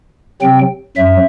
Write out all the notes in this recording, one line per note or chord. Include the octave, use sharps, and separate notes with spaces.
C3 F#3 C4 G5
F#2 F#3 E5